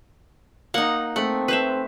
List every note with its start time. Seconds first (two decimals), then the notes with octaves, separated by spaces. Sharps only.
0.74 A#3 D#4 F#5
1.16 A3 C4 F#5
1.48 B4 C5 E5